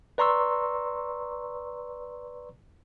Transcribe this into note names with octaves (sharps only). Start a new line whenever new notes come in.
B4 D5 A#5 C6 C#6 E6